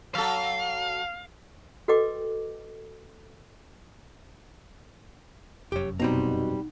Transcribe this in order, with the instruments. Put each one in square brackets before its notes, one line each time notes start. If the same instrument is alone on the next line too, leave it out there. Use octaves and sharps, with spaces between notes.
[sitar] F#3 A4 [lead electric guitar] F5
[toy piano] F#4 A4 B4 D#5 G5 D6
[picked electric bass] F1 F#2 [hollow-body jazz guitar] G4 C#5
[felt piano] B2 [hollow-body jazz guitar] G3 C4 A#5 [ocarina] D#4